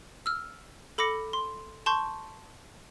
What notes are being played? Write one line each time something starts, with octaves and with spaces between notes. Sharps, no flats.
E6 F6
A4 B5 D6 A#6 C#7
C6
A5 C6 C#6 G6